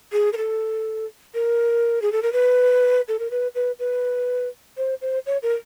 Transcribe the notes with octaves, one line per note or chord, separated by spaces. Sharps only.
G#4
A#4
A4
A#4
G#4
A4
A#4
B4
A4
A#4
B4
B4
B4
C5
C5
C#5
A#4